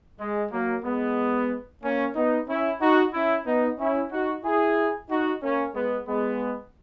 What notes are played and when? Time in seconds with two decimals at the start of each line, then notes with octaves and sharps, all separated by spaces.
0.20 G#3
0.52 F#3 A#3
0.85 G#3 B3
1.83 A#3 C#4
2.16 B3 D#4
2.48 C#4 E4
2.81 D#4 F#4
3.13 C#4 E4
3.47 B3 D#4
3.79 C#4 E4
4.12 D#4 F#4
4.44 E4 G#4
5.10 D#4 F#4
5.42 A#3 C#4
5.75 G#3 B3
6.08 G#3 B3